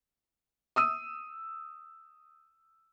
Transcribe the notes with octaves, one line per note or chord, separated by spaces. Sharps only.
D#6 E6 D#7